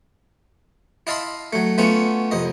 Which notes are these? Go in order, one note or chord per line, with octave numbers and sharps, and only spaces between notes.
E4 D#5 F5 A5 B5 C6
F#3 A3
A3 B3 C#4 F4 F#4
C2 F2 D#5